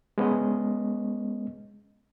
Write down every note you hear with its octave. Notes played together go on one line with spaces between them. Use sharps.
G#3 B3 C#4 D#5